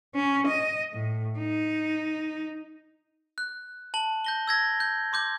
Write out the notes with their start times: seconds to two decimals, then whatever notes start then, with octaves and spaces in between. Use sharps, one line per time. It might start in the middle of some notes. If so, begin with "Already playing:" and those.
0.15 C#4
0.47 D#5
0.93 A2
1.39 D#4
3.38 F#6
3.94 A5 F#7
4.25 G6 A#6 G7
4.47 E6 G#6 A#6
4.80 G6
5.13 C6 D6 G6